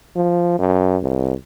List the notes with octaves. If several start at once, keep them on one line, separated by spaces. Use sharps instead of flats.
F3
F#2
C2